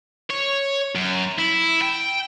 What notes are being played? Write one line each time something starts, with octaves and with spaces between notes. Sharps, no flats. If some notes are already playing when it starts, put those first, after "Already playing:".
C#5
F#2
E4
G5